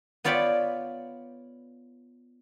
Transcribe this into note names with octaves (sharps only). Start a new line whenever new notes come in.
B3 F4 C#5 D5 G5 B5